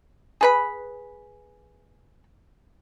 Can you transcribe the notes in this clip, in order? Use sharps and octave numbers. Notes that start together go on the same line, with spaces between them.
G#4 B4 B5